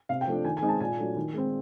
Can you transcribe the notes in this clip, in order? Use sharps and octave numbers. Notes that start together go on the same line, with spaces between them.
C3 F5
G5
F3 A3 D4
D#3 G#5
G#5
G#3 C4 D#4
A5
A#2 G#5
F#3 A3 D4
D#3
G#3 C4